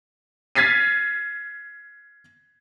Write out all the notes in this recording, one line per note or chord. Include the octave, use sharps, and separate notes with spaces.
F6 G#6 A6 B6 C7 D#7